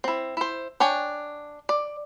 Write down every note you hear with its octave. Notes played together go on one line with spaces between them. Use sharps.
C4 E4
E4 C5
D4 C#5 G5 G#5
D5